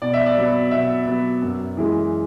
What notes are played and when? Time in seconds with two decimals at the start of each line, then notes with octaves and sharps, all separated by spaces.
0.02 B2 D5
0.13 E5
0.26 D5
0.37 F#3 B3
0.71 B2 E5
1.06 F#3 B3
1.42 F#2
1.77 E3 G#3